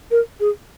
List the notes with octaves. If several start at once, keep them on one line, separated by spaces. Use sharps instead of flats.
A#4
G#4